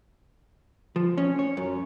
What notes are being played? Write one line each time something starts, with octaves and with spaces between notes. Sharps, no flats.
F3
C#4
C#5
F#2